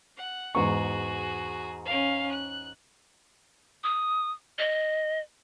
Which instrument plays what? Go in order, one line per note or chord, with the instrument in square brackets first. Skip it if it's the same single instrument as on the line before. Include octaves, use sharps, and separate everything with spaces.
[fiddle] F#5
[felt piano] E2 G#2 C#6 [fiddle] F#4 G#4
[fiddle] C#4 F5
F#6
[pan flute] D#6
D#5